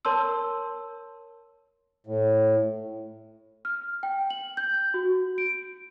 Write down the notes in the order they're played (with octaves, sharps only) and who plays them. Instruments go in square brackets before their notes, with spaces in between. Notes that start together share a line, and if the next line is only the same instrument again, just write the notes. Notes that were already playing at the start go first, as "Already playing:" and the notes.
[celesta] A#4 C#5 A5 C6 E6
[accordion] A2
[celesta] F6
G5
F#7
G6
F#4
D7